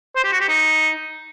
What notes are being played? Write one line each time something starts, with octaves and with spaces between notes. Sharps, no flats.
C5
G4
F#4
G4
D#4